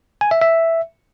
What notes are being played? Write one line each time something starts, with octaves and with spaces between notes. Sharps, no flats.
G#5
E5
E5